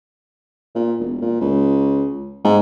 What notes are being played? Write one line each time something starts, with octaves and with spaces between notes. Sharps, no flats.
A#2
E1
A#2
C#2
G#2